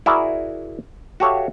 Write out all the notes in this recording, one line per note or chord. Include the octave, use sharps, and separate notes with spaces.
E4 F#4 G#4 A#4 D5 E5
F#4 G4 A4 C#5 E5 F5